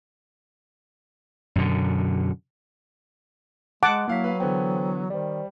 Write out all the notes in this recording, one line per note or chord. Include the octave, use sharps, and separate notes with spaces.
F#2 B2 D3
G#3 F#5 A5 D6
F#3 A#3 E4 F5 B6
B4 F5
D3 E3 B3 A4 C5 G5
D#3 G3 C5 D5